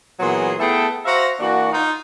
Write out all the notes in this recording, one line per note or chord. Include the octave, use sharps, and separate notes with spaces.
A#2 E3 F#3 B3 G#4 C6
A3 B3 E4 G#4 A4 G5
F#4 C5 E5 F5 A#5
E3 A#3 D4 F#4
D#4 F4